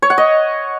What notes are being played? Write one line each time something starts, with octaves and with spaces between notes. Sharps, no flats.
C#5
F#5
D#5